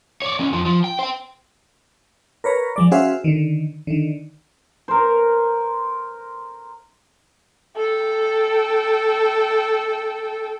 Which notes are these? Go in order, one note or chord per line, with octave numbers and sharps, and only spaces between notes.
C#5 D5
C#2 C#4
F2 F3
F3
G5
C5 G5
A#4 B4 C#5 A#5
F3 G#3 D5
C#4 F#4 G#4 C5 E5 F5
D3 D#3
D3 D#3
A#4 C5
A4 G5